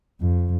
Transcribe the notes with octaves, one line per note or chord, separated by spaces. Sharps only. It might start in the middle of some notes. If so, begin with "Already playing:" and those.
F2